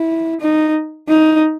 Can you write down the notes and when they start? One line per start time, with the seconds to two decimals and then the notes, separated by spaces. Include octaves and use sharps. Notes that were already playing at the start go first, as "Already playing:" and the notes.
Already playing: E4
0.41 D#4
1.09 D#4